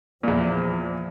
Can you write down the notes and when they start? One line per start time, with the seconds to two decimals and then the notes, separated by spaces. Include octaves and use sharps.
0.23 E2 A#2 F3